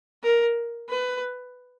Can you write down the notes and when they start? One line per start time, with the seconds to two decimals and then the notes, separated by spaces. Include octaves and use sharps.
0.23 A#4
0.90 B4